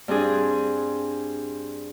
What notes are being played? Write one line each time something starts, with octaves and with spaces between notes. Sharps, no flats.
G2 C4 D4 G#4